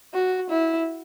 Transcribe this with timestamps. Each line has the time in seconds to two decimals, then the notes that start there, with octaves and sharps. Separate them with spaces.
0.13 F#4
0.50 E4